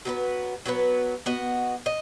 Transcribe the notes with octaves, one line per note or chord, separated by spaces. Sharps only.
F#3 B3 D#4 B4
F#3 B3 D#4 B4
B3 F#4 D#5
D#5